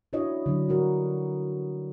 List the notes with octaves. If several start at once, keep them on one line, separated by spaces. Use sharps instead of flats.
D4 E4 F#4 C#5 D#5
D3 F#3 D4
G3 F#4 A#4